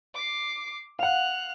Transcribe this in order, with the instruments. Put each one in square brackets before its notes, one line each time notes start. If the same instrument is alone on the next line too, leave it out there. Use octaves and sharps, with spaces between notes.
[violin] D6 C7
[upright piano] F5 F#5 [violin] F#6 F7